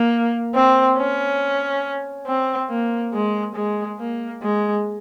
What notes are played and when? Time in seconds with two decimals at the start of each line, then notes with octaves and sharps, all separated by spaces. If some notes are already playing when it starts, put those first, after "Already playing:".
Already playing: A#3
0.54 C4
0.98 C#4
2.26 C4
2.69 A#3
3.13 G#3
3.55 G#3
3.99 A#3
4.42 G#3